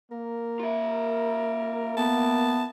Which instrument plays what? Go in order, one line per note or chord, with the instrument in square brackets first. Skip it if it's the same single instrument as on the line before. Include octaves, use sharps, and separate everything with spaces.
[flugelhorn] A#3 [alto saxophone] A#4
[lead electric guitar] F4 E5
[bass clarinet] B3 [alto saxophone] A5